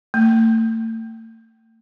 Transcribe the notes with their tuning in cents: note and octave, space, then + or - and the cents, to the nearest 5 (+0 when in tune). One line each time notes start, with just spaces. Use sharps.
A3 +40